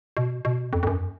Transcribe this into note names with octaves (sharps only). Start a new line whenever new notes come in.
B2
B2
F2
F2
F#2